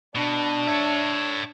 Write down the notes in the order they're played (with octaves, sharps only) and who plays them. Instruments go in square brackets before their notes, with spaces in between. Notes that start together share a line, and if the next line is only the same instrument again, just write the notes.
[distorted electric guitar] B2 [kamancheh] D4
[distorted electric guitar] C#5 E5